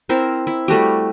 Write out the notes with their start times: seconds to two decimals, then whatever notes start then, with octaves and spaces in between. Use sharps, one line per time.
0.09 C4 E4 A#4 C5
0.47 E4
0.68 G3 A3 F#4 G4